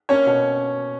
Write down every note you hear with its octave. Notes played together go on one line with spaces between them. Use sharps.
A#3 C#4 C#5
B2